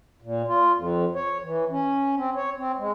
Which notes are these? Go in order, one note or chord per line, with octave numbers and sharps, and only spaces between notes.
A#2
F4
F2
C#5
E3
C#4
C4
C#5
C4
G#3